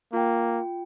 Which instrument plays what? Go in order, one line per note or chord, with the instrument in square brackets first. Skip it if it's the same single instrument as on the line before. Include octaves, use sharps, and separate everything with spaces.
[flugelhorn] A#3 [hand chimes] F4 G5